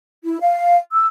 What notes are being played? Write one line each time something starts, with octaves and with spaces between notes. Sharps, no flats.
E4
F5
E6